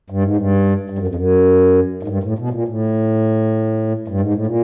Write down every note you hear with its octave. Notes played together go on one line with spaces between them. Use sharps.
G2
G#2
G2
G2
F#2
F2
F#2
G#2
G2
A2
B2
A#2
A2
G2
G#2
A2
A#2